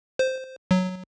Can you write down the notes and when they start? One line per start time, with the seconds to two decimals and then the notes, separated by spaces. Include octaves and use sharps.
0.19 C5
0.71 F#3